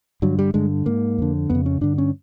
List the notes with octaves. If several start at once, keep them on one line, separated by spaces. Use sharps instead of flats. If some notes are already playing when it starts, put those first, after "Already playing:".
G2 D3 F#3
G3
G2 D3 G#3
G#2 A#3
F2 D3
F2 C#3 B3
C#4
G2 D3 D4
C#4